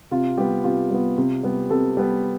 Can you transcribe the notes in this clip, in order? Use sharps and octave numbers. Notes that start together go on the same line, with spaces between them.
C3 F4
G3 B3 G4
C3 F4
G3 B3
C3
G3 B3
C3 A4
G3 B3